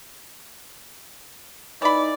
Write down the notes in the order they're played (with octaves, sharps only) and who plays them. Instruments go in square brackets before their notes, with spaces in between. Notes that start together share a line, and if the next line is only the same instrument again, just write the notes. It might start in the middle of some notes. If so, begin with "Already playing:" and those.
[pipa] E3 B5 [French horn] D#4 [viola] D5